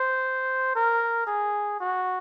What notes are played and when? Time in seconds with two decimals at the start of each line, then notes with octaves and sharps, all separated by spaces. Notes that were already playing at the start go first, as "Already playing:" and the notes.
Already playing: C5
0.75 A#4
1.27 G#4
1.81 F#4